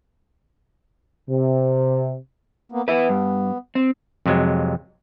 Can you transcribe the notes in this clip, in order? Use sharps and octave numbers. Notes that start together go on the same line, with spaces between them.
C3
A#3 B3
B3 B4 E5
G2
C4
F2 C3 F#3 G#3